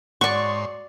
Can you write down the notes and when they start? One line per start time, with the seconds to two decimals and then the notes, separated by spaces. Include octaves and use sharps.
0.21 G#2 F#4 C#5 D5 C6 C#6